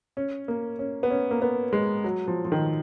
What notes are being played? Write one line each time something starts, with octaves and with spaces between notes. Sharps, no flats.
C#4
A#3
C#4
B3
C#4
A#3
B3
G#3
F#3
F3
F3
D#3